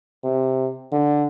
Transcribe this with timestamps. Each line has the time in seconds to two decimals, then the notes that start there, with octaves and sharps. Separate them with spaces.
0.24 C3
0.92 D3